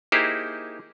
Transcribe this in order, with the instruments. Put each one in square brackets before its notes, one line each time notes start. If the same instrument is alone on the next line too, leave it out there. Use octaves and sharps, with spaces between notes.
[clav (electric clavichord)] A#3 D#4 E4 G4 G#4 C5